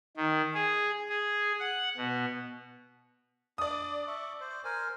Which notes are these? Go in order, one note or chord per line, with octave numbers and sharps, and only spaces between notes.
D#3
G#4
G#4
F#5
B2
D4 D5 D#6
E5 C#6
C5
A#4 C5 G#5